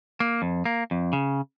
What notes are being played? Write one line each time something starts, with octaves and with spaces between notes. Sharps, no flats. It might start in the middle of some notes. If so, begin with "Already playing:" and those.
A#3
F2
A#3
F2
C#3